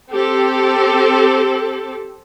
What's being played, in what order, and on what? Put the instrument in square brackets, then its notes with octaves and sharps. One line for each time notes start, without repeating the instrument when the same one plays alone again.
[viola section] C4 G4 A4